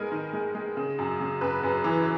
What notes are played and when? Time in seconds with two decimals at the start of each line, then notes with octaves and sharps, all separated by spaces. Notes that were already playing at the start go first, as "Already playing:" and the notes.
Already playing: G#3 B3 D#4 A#4 G#5
0.12 D#3
0.33 G#3
0.55 G#3
0.77 C#3
0.98 F#2
1.20 C#3
1.41 F#2 B4
1.63 F#2
1.84 E3